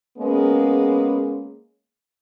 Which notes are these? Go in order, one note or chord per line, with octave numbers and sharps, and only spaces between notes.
G#3 A#3 B3 C#4 G#4